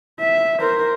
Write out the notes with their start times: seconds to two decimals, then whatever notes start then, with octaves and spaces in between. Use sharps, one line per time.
0.20 E5
0.60 A#4 C5